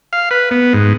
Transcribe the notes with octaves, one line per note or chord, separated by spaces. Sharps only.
F5
B4
B3
G#2